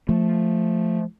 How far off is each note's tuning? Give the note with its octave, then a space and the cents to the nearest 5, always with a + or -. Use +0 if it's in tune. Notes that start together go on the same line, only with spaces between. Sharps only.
F3 +0 A3 +0